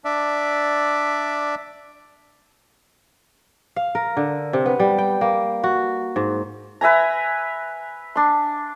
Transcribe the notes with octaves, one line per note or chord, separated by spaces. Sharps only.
D4 D5 E5
F5
A#4
D3
C3
B3
G3
G5
A#3
F#4
G#2
B4 E5 G#5 A#5
D4 C6